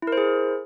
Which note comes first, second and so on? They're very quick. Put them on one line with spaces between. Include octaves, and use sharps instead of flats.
E4 A#4 C5 G#4